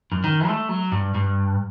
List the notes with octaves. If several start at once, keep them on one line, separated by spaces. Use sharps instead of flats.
F#2
D#3
A3
F#3
G2
G2